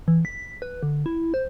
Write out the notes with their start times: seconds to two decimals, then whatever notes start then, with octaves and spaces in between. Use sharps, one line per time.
0.08 E3
0.25 B6
0.62 B4
0.83 D3
1.06 E4
1.34 C5